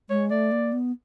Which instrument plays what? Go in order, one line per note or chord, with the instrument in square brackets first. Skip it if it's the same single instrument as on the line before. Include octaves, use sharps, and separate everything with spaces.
[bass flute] G#3 [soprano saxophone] C#5
[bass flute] A3 [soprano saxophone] D5
[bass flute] A#3
B3